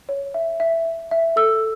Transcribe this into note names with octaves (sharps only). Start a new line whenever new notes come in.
C#5
E5
E5
E5
E5
A4 E6